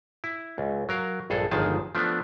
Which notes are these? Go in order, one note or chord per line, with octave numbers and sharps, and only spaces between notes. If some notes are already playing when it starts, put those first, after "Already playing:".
E4
C#2
F#3 A#4 F5
A#1 G2 G#4 A4
G1 C#2 D#3 F3 G#4 A5
F3 A3 B3 D4